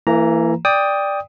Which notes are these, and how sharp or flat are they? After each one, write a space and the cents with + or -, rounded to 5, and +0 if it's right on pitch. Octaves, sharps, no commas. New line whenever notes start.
E3 +15 A#3 -30 A#5 +0
D5 +0 G5 +15 D#6 +10